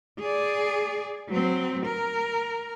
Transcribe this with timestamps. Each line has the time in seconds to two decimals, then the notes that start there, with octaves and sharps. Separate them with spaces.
0.20 G#4 D5
1.28 F#3 C4
1.86 A#4